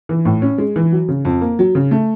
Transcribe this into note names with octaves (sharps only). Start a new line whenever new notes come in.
E3
A2
C#4
G#3
E3
F#3
C#3
F2
A#3
F#3
C#3
A3